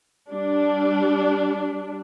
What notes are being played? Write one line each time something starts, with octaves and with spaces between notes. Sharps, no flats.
G3 D4